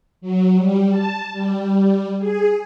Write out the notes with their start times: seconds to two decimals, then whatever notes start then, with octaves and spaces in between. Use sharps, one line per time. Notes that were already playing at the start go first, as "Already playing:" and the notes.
0.21 F#3
0.56 G3
0.91 A5
1.33 G3
2.19 G#4